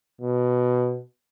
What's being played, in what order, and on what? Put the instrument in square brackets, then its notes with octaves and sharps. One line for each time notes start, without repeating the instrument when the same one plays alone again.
[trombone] B2